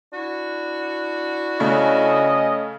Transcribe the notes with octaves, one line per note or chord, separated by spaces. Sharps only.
D4 E4 F#4
C#3 A3 C#4 D#5